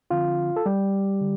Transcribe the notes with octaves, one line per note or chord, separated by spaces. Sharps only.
D3 F3 C4 F4 F5
A4
G3 G4
D3